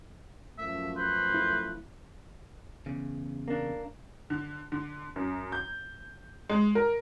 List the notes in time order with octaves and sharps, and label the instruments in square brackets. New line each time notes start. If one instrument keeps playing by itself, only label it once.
[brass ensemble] F#2 F3 A3 [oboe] E5
[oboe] B4 [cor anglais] C5
[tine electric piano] E4
[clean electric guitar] E2 C#3
[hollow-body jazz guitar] A#3 D4
[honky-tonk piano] D3
D3
F#2
G6
G#3
A#4